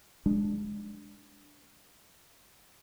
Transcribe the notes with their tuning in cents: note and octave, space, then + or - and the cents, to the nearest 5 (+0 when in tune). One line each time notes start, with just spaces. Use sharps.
G#3 +0 D4 +0